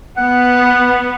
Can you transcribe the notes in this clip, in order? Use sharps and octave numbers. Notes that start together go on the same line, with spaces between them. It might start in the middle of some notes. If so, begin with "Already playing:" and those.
B3 F#5